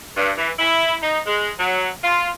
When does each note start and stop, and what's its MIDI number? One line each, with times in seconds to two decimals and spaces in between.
0.16 0.32 43
0.38 0.51 52
0.59 0.96 64
1.02 1.19 63
1.27 1.51 56
1.59 1.89 54
2.04 2.30 65